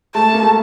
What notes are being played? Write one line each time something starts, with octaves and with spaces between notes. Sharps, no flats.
A3 A5
A#3
A3